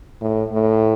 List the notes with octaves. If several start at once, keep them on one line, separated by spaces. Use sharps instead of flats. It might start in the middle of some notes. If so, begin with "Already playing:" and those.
A2
A2